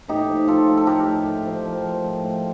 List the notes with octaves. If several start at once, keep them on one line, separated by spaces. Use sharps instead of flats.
A2 D#4 G4
F3
F3 F4 A4
F3
A4
A2 G4 A#4
A2
A2
F3
F3
F3
A2
A2